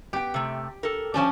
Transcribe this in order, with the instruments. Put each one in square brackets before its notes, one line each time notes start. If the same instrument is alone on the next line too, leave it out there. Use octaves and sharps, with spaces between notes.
[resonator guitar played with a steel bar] B3 G5 [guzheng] G4
[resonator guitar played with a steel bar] C3 A3
A4 A#4
[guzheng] F3 C#4 D4 [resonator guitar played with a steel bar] G4 C5 A5